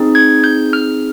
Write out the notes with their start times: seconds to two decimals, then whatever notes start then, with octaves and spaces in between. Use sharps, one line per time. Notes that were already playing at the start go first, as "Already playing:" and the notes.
Already playing: C4 D#4 G#4
0.15 G#6
0.44 G6
0.73 F6